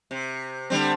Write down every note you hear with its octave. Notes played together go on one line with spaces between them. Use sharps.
C3
D3 G3 C4